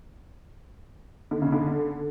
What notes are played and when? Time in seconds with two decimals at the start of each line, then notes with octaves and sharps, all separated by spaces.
1.31 D3
1.42 C#3
1.52 D3